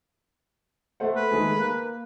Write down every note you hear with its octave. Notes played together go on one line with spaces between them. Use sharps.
A3 C5 F#5
B4
D#3 G#3 A3
A#3